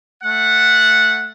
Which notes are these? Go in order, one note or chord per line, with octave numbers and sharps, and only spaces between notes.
A3 F#5